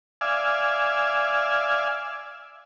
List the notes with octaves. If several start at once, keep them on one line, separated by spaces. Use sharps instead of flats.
D5 E5 F5 G#5